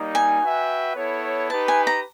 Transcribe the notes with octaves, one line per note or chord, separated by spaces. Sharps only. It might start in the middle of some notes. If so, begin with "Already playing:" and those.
Already playing: G3 A#3 D#4
G#5
F#4 B4 E5 G5
B3 E4 A4 C#5
D#4 G4 B4 A5
G#5
A#5